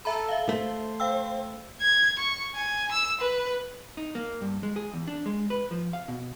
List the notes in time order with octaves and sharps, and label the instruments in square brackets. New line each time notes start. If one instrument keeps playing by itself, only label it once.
[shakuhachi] A4 [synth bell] E5 A#5 B5
[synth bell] E5 F5
[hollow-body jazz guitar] A3 [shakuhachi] C5
[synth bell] F5 G5 E6
[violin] G#6
C#6
G#5
E6
B4
[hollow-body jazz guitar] D#4
A#3
G2
G#3
G#4
E2
D4
G#3
B4
F3
F5
B2